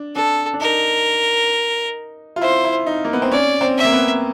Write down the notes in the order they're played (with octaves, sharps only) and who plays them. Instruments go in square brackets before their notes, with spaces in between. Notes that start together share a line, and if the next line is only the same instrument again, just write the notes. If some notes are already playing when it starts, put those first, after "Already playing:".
Already playing: [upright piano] D4
[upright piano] D4 [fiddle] A4
[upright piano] D4
[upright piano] D#4 [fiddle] A#4
[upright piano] F4
[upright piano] E4 [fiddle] C5
[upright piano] E4
D#4
A#3
B3
C4
[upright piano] C#4 [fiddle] D5
[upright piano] C4
[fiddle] E5
[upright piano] A#3
B3